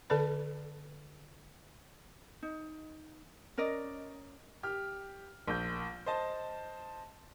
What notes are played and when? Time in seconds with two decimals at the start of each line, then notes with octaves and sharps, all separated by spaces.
0.10 D3 A4 B4 D5 B5
2.43 D#4
3.58 C#4 A#4 D5 D#5
4.63 G4 F6
5.47 A#1 G6
6.06 C5 D#5 A5